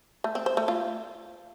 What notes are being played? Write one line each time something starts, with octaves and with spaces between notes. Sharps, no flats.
A3
C4
C5
A3
F4